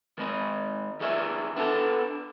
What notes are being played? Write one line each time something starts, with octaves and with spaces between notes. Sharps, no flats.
D#3 G#3 D#5
D#3 G#4 D5 E5
B3 D4 A4 A5